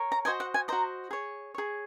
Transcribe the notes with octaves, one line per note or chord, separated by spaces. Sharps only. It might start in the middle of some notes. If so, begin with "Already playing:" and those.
Already playing: A#4 C#5
A#5
F#4 C5 D#5 G#5
F#5
G#5
F#4 C5 D#5 A#5
G#4 C#5
G#4 C#5